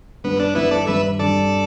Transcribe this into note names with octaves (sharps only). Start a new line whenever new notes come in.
G2 G3 B3 D4
D4
G2 G3 B3 D4 E4
A4 D5
G2 G3 D4 B4 E5
G2 G3 D4 A4 D5